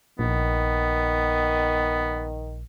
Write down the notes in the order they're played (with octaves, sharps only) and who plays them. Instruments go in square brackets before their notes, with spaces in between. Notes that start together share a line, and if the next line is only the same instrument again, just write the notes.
[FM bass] A#1 [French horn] D#3 [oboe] B3